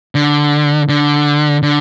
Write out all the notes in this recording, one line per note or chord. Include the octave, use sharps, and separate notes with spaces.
D3
D3
D3